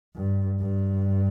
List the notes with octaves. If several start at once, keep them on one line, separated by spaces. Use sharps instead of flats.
G2
G2